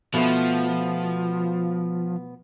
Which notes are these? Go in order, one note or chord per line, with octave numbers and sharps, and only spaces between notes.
B2 F3 A3 B3